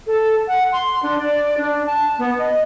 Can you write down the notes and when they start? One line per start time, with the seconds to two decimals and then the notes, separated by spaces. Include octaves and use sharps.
0.07 A4
0.48 F#5
0.72 C6
1.03 D4
1.19 D5
1.57 D4
1.86 A5
2.18 B3
2.39 D#5